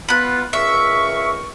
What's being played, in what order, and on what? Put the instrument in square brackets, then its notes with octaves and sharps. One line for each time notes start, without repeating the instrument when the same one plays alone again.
[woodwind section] B3 F4 [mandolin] B5 F#6
[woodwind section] C#2 A#4 C#6 [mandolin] E5